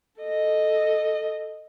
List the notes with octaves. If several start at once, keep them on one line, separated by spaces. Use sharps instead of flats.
A4 D#5